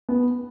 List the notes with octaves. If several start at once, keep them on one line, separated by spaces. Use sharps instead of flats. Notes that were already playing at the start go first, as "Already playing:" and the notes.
B3